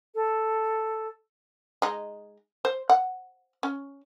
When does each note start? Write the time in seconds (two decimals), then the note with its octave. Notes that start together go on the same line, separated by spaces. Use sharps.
0.15 A4
1.82 G#3 D#4
2.65 C5
2.90 F#5
3.63 C#4